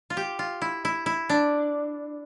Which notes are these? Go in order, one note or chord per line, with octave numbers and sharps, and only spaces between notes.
F4
G4
F4
E4
E4
E4
D4